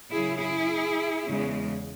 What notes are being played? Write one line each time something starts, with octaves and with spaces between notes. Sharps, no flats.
F#2 C#3 F#3 E4 G#4
E4 G#4
E2 C#3 G#3